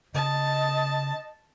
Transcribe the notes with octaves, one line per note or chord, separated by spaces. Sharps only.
C#3 D#5 A5